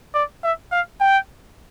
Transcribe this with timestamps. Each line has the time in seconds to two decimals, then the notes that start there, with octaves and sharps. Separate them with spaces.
0.15 D5
0.43 E5
0.72 F5
1.00 G5